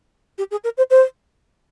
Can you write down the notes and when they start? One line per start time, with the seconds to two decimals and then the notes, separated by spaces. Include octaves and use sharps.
0.38 G4
0.51 G#4
0.64 A#4
0.77 C5
0.90 C5